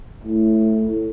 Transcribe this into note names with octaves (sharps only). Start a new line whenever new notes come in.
A2